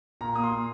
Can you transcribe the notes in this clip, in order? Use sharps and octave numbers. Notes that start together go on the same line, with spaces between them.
A#2 A#5
A#3 D#6
C6
A#3